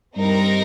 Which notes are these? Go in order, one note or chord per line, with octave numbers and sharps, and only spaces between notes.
G2 G3 C4 D#4 A#4